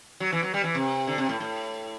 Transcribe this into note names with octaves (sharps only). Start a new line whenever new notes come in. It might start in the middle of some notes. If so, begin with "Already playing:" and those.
F#3
E3
F#3
G3
E3
C3
D3
C3
A2
A2